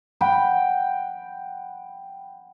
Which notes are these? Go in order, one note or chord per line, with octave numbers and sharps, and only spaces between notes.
F#5 G5 B5